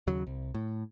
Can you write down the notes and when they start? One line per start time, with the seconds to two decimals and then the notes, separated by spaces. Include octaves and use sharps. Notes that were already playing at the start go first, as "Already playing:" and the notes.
0.07 D#2 C#3 F#3
0.27 C2
0.54 A2